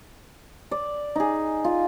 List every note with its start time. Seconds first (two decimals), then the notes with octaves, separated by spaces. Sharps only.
0.71 D5
1.16 D#4 G#4
1.65 F4